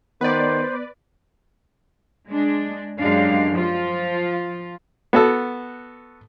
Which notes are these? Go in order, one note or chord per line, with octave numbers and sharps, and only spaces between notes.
D#3 B3 B4 C5 D5
G#3 D4
F#2 G#3 D4 G4 F5
F3 F4
B3 F#4 A4